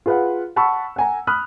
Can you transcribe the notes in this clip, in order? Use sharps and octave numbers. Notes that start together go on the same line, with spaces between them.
F4 G#4 B4 F5 F#5
F#5 A5 B5 C#6 E6
F#5 G#5 A#5
B5 D#6 F6 F#6